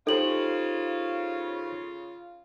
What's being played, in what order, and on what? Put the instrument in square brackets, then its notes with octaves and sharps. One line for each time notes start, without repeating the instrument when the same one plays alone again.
[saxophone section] C#3 F4 [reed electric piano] D#4 G4 C5 [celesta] A4 F#7